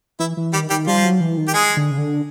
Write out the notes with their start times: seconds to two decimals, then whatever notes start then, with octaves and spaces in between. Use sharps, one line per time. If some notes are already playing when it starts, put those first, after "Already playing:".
0.20 E3 E4
0.37 E3
0.53 D#3 G3 G4
0.70 D#3 G3 G4
0.87 F3 G3 F4
1.04 F#3
1.20 E3
1.38 D#3
1.48 G4
1.54 G#3 G#4
1.77 D3
1.91 C#3
1.98 D3